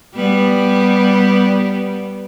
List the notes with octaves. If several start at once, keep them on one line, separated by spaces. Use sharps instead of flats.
G3 B3